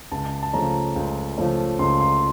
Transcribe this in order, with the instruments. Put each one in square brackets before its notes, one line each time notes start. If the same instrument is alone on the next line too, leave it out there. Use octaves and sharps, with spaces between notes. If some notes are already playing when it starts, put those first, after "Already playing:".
[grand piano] C#2 A5
A5
C#3 F3 A3 C#4 A#5
C#2
C#3 F3 A3 C#4
C#2 C6
C6